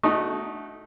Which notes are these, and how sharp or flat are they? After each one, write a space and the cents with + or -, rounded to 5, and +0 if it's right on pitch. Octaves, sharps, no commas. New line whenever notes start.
A3 -20 D#4 +0 F#4 +0